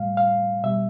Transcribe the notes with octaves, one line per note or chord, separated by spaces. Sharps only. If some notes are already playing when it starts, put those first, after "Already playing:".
Already playing: A2 G3 F5
F5
B2 G3 E5